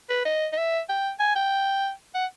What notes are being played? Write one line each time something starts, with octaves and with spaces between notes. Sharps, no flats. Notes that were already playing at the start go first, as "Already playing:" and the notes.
B4
D#5
D#5
E5
G5
G#5
G5
F#5